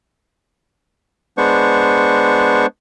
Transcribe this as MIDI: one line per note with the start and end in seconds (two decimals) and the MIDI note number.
1.38 2.66 56
1.38 2.66 59
1.38 2.66 62
1.38 2.66 72
1.38 2.66 85